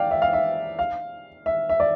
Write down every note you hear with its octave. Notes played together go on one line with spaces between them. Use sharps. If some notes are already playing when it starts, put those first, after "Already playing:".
Already playing: D5 F5 G5
E5
F5
E5
F5
E5
E5
D5